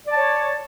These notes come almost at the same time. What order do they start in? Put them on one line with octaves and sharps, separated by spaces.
D5 A5 C#5